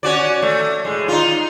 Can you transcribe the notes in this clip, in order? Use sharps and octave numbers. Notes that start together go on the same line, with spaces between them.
C#4 F#4 D5
A3
A2 G#3
D#4 F4